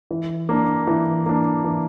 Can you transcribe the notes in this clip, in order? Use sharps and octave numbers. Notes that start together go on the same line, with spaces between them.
E3
A#3 D4
E3
A#3 D4
E3